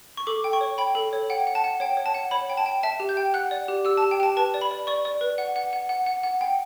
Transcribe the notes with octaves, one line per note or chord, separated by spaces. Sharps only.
C#6
A4 D6
G5
C#6
C#5
G5 B5
A4
C#5
F#5 G5
F#5
A5
F#5
C#5 G5
C#5
A5
F#5
C#5 B5
G5
A5
G5
E5 A5
G4
G6
G5
F#5 F#6
D5
G4
G4 E6
A5
G4
G5
G4 A5
B4 A5
D5
B5
D5
D5 C#6
D5
B4
F#5
F#5
F#5
F#5
F#5
F#5
G5